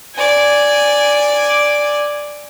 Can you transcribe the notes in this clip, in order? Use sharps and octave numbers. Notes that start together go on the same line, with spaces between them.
D5 G#5